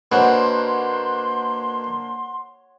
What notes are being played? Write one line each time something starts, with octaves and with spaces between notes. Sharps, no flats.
B2 A#3 D4 C5 C#5 F#5 C6